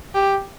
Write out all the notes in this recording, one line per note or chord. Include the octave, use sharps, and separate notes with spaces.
G4